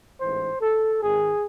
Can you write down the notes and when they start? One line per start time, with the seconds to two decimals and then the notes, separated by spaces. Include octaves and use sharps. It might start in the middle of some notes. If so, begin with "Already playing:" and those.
0.20 A1 G#2 E3 C5
0.60 A4
1.01 G#1 G#2 D#3 G#4